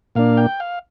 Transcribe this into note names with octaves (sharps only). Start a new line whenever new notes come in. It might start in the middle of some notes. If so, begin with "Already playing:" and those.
A#2 A#3 D4 F5
G5
F5